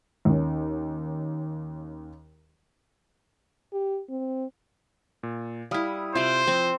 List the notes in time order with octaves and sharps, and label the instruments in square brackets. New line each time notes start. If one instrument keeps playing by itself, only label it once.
[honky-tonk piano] D#2 C#4
[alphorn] G4
C4
[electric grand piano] A#2
[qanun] G3 E4 [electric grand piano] F5 D#6 F6
[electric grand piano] C3 E5 E7 [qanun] F4 D5 [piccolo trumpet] C5
[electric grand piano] F3 [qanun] C4